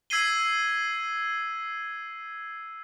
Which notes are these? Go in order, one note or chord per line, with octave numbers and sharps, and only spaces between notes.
E6 G#6 B6 C7 D#7 G7